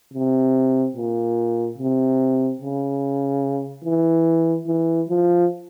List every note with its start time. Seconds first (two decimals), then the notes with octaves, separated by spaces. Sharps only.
0.13 C3
0.96 A#2
1.78 C3
2.62 C#3
3.85 E3
4.67 E3
5.09 F3